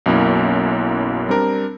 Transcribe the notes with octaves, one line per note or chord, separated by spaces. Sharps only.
B1 F#2 A#3 E4
G3 C4 D4 A#4